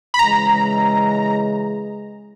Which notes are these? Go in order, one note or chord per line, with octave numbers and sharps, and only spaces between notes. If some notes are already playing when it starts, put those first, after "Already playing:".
B5
C#3 E3 G#3 A#5